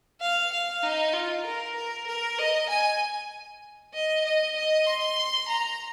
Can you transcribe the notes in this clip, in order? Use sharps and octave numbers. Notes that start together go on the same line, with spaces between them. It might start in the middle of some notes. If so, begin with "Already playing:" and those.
F5
F5
D#4
F4
A#4
A#4
A#4
D#5
G#5
D#5
D#5
D#5
C6
A#5